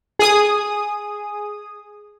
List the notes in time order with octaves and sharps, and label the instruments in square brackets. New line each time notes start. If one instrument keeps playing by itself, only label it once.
[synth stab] G#4 D#6